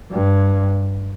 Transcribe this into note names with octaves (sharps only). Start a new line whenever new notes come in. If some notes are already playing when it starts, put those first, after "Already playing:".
G2